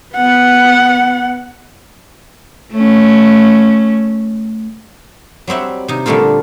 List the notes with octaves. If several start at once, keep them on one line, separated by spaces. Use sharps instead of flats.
B3 F#5
A3 C#4
F#3 G3 C4 E5 F#5
C3 D#4
A#2 D3 G3 A3 C4 F4